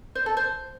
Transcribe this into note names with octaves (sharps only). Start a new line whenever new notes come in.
C5
A4
C5